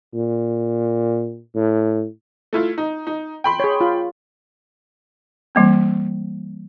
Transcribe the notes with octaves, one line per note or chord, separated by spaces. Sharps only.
A#2
A2
A3 E4 F4
D#4
D#4
G5 B5 C6
G#4 C#5
F4
E3 G3 A#3 C4